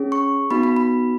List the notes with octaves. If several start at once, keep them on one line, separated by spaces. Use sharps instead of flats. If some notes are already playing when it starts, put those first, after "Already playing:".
Already playing: C#4 G#4
C#6
B3 D#4 F#4 B5
B5
B5